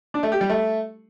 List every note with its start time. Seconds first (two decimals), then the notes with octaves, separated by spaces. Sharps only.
0.14 D4
0.23 A3
0.32 G4
0.41 G3
0.50 A3